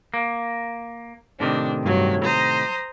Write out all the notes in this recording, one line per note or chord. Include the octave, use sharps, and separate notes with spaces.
A#3
A2 C3 D#3 D4
G2 F#3
C5 A#5 D#6